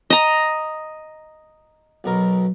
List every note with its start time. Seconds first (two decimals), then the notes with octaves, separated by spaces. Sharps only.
0.10 D#5 A#5
2.04 B1 B2 A#4